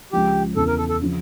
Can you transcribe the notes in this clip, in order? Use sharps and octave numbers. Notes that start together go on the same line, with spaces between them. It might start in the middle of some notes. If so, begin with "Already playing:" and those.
C#2 C#3 F3 G4
E2 C#3 E3 A4
A#4
A4
A4
C#3 F3 C#4